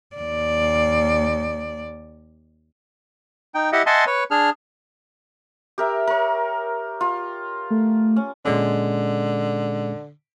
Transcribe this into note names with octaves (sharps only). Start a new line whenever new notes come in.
D#2 D5
D#4 G5
E4 G4 D#5 E5 F#5
D#5 E5 F#5 G#5 A5 C6
B4 C#5
D4 G#4 F6
G4 A#4 E5
A#4 C#5
F4
A3
C#4
A#2 D3 G#3 C#4